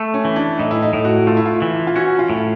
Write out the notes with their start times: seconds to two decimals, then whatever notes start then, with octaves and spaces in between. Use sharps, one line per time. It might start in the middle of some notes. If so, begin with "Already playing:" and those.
Already playing: A3
0.14 C#4
0.25 E3
0.36 D4
0.59 A2 D#4
0.71 E4
0.82 D#4
0.93 A2
1.05 F#4
1.27 A3 F4
1.37 E4
1.46 F4
1.62 E3
1.87 F4
1.96 C#4 F#4
2.19 F4
2.30 A2